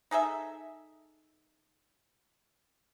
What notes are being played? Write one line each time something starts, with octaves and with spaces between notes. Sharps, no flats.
D#4 G#4 A4 E5